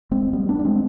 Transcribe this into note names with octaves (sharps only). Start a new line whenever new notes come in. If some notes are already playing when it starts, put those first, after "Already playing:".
G#3 C4
G3 B3
B3 D4
D4
G#3 C4